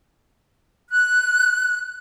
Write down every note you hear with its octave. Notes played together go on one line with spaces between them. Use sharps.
F#6